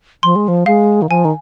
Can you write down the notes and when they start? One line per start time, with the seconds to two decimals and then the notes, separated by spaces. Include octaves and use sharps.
0.23 F3 C6
0.36 G#3
0.48 F3
0.66 G#3 F5
1.02 D#3
1.09 F3 G#5
1.25 D#3